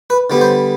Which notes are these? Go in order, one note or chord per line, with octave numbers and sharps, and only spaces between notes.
B4
D3 G3 B3
C5